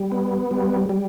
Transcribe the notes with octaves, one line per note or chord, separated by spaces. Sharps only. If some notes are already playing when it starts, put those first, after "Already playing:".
Already playing: G3
B3
G3
G3